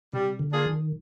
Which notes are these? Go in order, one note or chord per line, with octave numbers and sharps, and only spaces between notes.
C3 G3
D3
A#3 D4 F4 G#4
D#3